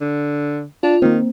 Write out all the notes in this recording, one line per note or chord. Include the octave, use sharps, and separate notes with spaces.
D3
D4 F4
D#3 A#3 C4